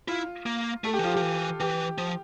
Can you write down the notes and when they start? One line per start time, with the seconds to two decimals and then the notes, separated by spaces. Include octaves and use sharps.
0.08 E4 F4
0.46 A#3
0.84 A3 A4
0.94 G4
0.99 E3
1.03 F3 F4
1.14 F3 G4
1.22 E3
1.60 E3 G4
1.98 F3